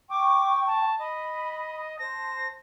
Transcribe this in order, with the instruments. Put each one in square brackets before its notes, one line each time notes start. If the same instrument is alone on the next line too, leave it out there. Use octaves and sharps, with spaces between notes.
[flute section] G5 C#6 [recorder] D6
[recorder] A5
[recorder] D#5 [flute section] B5
[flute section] C5 A5 [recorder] A#6